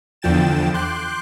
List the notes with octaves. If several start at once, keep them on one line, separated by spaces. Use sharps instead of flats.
E2 D3 F3 G5 A6 E7
C6 D6 F#6 G6